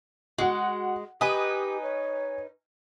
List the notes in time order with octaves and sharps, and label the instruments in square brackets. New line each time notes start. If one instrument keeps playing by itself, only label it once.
[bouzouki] G#3 [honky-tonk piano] F#4 F#5
[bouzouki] D#4 B4 [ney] G4 [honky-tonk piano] G#5 D#6
[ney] C#5